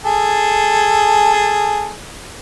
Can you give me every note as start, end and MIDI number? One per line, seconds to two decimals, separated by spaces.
0.05 1.92 68
0.05 1.92 69